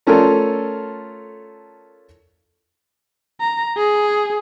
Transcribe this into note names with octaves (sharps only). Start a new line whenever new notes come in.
A3 C#4 F4 A4 A#4 D5
A#5
G#4